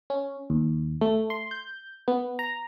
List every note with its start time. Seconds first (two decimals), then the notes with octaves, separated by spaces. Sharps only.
0.10 C#4
0.50 D#2
1.01 A3
1.30 C6
1.51 G6
2.08 B3
2.39 A#5